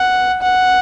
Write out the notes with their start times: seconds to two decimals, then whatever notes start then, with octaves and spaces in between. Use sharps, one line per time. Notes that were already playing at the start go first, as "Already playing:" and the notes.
Already playing: F#5
0.42 F#5